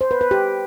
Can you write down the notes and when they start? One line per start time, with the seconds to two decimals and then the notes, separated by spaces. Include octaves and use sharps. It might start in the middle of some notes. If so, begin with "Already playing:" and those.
0.01 C5
0.11 B4
0.21 B4
0.31 G4